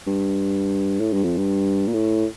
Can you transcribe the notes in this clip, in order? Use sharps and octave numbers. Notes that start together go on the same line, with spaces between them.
G2
A2
G2
F2
G2
A#2
A2